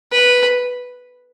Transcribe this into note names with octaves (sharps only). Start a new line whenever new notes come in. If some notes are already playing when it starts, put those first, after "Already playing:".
B4